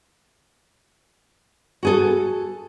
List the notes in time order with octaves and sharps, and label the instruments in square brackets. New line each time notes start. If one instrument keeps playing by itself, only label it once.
[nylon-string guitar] F#4 G#4 A4